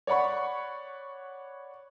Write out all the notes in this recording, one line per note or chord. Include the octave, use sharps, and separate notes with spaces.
C#5 D5 F#5 B5 C#6